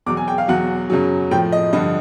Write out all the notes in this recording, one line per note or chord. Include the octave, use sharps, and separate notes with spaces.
E2 B2 F#3 D6
G#5
G5
F5
E2 B2 F#3 F#5
F#2 C#3 F#3
A2 F3 G5
D#5
G2 D3 F3 D#5